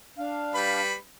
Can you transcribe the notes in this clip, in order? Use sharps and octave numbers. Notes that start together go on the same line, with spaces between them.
D4 F5
G3 B4 B5